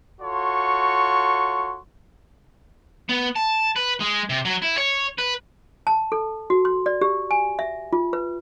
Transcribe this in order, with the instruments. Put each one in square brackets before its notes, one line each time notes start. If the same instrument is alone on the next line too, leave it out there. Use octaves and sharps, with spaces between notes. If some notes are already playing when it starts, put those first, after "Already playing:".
[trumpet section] F4 F#4 A4 C#5 C6 C#6
[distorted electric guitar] B3
A5
B4
G#3
C3
F#3
E4
C#5
B4
[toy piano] A5
A4
F#4
C6
D5
G4
G#5
E5
F4
B4